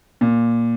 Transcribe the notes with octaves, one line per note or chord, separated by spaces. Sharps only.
A#2